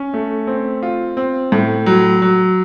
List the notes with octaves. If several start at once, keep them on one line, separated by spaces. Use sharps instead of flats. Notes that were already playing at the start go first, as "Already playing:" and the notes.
Already playing: C#4
A3
C4
F4
C4
A2
F#3
F#3